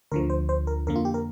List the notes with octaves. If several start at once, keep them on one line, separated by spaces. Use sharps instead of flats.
D2 D3 F3 A#4
C5
C5
A#4
F2 D3 A#3 A#4
F4
G4
A#4